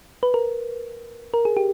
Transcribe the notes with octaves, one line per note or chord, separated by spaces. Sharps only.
B4
A#4
A#4
G#4
G4